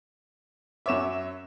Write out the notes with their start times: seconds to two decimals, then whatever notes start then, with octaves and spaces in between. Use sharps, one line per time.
0.86 F#2 C#5 E5 D6 E7